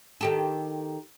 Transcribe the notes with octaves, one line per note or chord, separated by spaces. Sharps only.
D#3 G4 A4